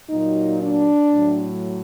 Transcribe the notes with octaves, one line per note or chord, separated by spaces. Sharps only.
A#2 F#3 D#4
D4
A2 F#3